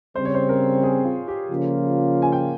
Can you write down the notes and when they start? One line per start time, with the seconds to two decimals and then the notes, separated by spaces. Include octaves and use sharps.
0.15 C#3 G3 C4 C5
0.25 C#5
0.35 C5
0.49 A#4
0.83 G#4
1.05 F4
1.28 G4
1.50 C#3 F3 A#3 C#4 F4
2.22 G#5
2.32 G5